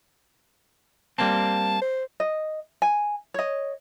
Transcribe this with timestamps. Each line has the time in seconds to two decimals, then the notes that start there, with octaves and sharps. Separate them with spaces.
1.18 G3 A#3 C4 A5
1.81 C5
2.20 D#5
2.82 G#5
3.34 C#5 D#5